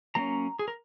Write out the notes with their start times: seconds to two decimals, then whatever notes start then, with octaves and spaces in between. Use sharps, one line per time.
0.15 F#3 A#3 C#4 A#5
0.59 G#4
0.68 A#4